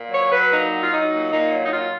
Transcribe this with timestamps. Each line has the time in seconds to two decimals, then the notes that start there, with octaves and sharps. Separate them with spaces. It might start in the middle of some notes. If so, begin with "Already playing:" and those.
Already playing: A#2
0.10 F#3 C#5
0.30 F#3 B4
0.50 A#2 D#4
0.71 F#3
0.80 F4
0.90 F#3 D#4
1.11 A#2
1.30 A#2 D#4
1.50 F#3
1.65 D#4
1.70 A#2 F4